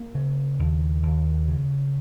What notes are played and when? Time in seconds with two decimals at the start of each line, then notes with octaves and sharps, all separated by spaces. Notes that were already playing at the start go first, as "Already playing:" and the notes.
Already playing: A#3
0.15 C#3
0.59 D#2
1.03 D#2
1.48 C#3